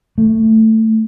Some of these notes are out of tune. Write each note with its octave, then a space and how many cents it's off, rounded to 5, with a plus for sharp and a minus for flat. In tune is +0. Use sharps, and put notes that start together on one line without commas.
A3 +10